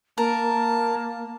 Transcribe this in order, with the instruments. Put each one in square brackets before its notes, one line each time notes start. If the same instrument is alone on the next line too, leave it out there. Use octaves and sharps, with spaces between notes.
[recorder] A#3 [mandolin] A#4 [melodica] A5